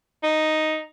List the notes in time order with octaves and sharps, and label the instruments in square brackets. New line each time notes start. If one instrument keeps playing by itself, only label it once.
[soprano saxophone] D#4